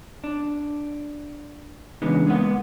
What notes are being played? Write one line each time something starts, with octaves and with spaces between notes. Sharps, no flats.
D4
C#3 E3 G#3 B3 D4 D#4
G#3 A#3 B3 F#5